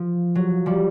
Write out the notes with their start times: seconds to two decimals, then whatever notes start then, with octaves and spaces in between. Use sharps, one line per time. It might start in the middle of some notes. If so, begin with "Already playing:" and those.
Already playing: F3
0.35 F#3
0.66 F3 G3